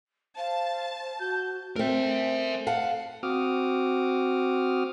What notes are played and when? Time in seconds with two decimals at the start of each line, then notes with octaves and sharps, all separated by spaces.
0.37 C5 F5 A5
1.19 F#4 G6
1.76 A3 C4 A#4 E5
2.67 F5 F#5 A5
3.23 C4 F#4 D6 D#6 F6